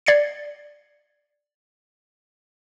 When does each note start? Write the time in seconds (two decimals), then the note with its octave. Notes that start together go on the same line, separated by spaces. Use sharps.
0.06 D5 G#6 C7 C#7